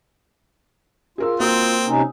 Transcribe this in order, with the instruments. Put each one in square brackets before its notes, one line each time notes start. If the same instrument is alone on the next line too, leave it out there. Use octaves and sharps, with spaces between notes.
[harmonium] F4 [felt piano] G#4 A#4 E6
[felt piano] A#3 F#4 D#6 [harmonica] C4
[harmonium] C3 C#4 D#4